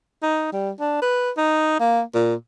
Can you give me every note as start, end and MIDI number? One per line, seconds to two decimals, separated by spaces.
0.22 0.50 63
0.52 0.71 55
0.80 1.01 62
1.02 1.31 71
1.37 1.75 63
1.80 2.02 58
2.15 2.35 46